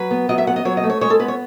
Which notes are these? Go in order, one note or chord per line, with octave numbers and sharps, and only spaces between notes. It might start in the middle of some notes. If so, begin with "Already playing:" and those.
Already playing: F#3 B4
B3
F#3 D#5
E5
B3 F#5
D#5
F#3 C#5
D#5
A3
C#5
G#3 C#5
A4
B3 B4
C#5